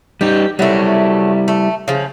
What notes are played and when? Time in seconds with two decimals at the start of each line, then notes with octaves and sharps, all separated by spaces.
0.21 G3 D#4 G4
0.59 F#3 G3 A3 E4
1.48 A3
1.88 C#3 F3